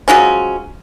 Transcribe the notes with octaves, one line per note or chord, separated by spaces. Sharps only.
F3 F#3 G#3 C#4